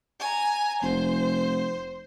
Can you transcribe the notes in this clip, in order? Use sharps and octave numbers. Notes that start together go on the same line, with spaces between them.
G#5 A#5
F1 C5